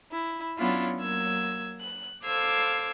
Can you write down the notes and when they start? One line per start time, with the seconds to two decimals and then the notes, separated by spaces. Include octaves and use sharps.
0.12 E4
0.57 F#3 B3 C#4 D4 E4 F4
0.97 F#3 A#3 E6 G#6
1.80 F#6
2.25 A4 C5 F5 D6 E6 G#6